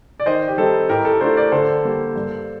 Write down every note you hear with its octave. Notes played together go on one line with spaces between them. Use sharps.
D5
D#3 C5 D#5
G4
G3 C4 D#4 A4
A2 G4 A#4
A4
A3 D4 F4 A4 C5
A#4 D5
D3 A4 C5
G3 A#3
G2